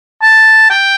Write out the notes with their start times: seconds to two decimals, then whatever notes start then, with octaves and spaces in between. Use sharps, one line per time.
0.22 A5
0.70 G5